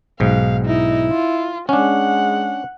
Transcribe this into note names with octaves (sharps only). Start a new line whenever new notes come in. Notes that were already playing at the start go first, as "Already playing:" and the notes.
B1 G#2 F5
D#4 E4
F4
G#3 C#4 D4 F#5